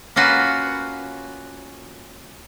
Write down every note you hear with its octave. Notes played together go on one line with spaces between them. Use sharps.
A#3 C#4 F4 F#4 B4